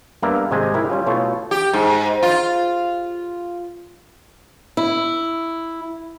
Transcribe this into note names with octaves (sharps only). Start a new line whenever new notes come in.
G2 A#3 B3 D5 E5 A#5
G#1 C3 G#3 C5 G#5
C4 D#4 E4 G4 A#4
G3 C#4 F4
B2 A3 E4 F4 C#5
G4
G#2
F4
E4